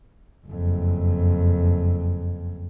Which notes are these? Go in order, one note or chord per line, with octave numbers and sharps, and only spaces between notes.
F#1 F2